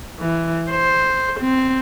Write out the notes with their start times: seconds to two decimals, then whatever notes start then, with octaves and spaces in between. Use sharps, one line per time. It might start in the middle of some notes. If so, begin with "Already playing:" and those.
0.20 E3
0.70 C5
1.40 C4